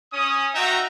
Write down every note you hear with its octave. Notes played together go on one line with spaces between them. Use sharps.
C#4 D#6
D#4 F#4 E5 G5 A#5